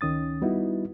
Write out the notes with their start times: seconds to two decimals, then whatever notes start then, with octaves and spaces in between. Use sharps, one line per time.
0.01 C#2 D#3 C#4 D#6 A6
0.42 G3 B3 D#4 E4 F#4